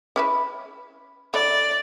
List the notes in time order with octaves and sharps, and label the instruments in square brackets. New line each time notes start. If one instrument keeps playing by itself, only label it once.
[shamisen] C#4 E4 B4
[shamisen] D3 E4 [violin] D5